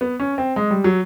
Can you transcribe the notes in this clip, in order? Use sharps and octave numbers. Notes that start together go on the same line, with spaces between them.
B3
C#4
C4
G#3
G3
F#3